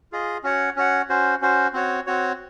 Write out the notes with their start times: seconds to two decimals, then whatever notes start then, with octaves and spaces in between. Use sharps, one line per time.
0.12 F4 G#4 D#5
0.43 C#4 F#4 C#5 F#5
0.76 C#4 F#4 C#5 F#5
1.09 C#4 F#4 C5
1.41 C#4 F#4 C5
1.73 C4 F#4 C#5
2.07 C4 F#4 C#5